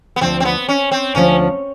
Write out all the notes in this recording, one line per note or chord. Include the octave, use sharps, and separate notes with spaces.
B3
D2 D3 F3 C4
C4
B3
C#4
C4
D2 D3 F3 C#4